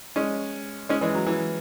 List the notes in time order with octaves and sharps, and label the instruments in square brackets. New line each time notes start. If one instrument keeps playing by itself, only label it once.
[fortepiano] G#3 C#4
G#3 C#4
E3 G#3
F#3
E3